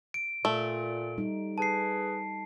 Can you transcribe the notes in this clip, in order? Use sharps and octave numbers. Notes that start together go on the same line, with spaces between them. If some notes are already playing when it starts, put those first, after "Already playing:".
D7
A#2 A3
G3 D#4
G#4 B4 A5 C7